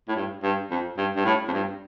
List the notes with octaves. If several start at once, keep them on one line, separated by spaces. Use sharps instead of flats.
A2
G2
G2
F2
G2
G2
A2
F2
G2